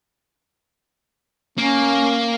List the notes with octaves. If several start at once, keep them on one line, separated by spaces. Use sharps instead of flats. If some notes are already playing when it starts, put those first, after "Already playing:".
A#3 C#4